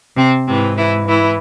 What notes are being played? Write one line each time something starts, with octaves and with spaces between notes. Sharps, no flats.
C3 C4
G#2 C3 E3 C4
E3 E4
E3 E4